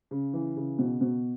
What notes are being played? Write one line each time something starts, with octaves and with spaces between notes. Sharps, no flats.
C#3
E3
C#3
B2
B2